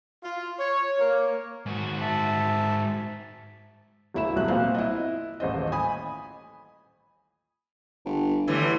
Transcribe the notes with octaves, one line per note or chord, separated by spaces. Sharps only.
F4
C#5
A#3
G#2 F#4
E5 A5
G1 D2 E4 B5 E7
E1 C2 F#3 F#6
C2 A#2 C5 F5
E4 D#5
D#1 A1 C5 D#5
G#5 B5 D#6
G1
A2 D3 E3 G3